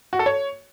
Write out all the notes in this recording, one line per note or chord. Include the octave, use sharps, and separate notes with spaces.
F#4
A4
C#5